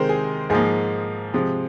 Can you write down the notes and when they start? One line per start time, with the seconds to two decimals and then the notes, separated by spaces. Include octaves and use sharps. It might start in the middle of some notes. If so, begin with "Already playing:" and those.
Already playing: C3 D#3 G#3 A#4 C5
0.09 G#4
0.50 G#2 F3 A#3 G#4
1.34 C3 F3 G#3